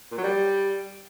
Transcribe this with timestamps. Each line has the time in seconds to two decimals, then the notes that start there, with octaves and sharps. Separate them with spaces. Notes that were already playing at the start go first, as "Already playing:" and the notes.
0.12 A#2
0.17 F#3
0.23 G3